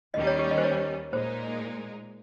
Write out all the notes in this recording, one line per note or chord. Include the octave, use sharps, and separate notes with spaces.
D#2 D#3 G3 C#4 D#5
C#5
G4
D#5
C5
C#5
A#2 G#3 D#4 A#4 C5